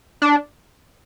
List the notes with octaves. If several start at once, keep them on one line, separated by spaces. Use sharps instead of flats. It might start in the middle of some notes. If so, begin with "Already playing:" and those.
D4